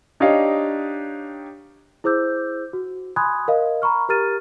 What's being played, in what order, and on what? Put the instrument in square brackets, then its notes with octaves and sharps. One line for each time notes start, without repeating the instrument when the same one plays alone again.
[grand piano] D4 D#4 G4 C#5 D#5 F5
[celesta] E4 G#4 C5 D6 E6 G6
F#4
G#5 B5 C6 D#6 F#6 G#6
A#4 D#5 F5
A#5 B5 C#6 F6
G4 A#4 A#5 F6 A6 D#7